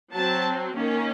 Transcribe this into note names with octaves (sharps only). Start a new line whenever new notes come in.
F#3 C4 A5
D#3 A#3 C#4